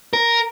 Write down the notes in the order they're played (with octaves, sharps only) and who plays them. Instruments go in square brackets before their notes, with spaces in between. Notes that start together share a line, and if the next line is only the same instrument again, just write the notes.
[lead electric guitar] A#4